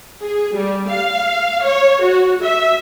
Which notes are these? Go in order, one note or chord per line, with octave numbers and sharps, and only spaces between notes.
G#4
G3
F5
C#5
F#4
E5